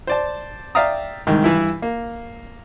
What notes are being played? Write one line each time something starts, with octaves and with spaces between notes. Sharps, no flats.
C5 D5 A5
D5 E5 F5 G5 A#5 D#6
C2 G#2 D#3
G2 E3 E4
A#3